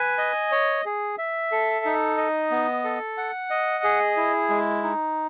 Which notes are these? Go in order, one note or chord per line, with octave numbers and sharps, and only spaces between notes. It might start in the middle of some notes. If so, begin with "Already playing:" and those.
Already playing: B4 G#5
D#5
C#5
G#4
E5
A4
D#4
D#5
B3
A4
F#5
D#5
G#4
E4
G#3
D#4